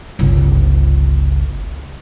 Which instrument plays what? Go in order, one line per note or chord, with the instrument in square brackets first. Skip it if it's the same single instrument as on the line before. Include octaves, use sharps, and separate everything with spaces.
[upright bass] G1 C#2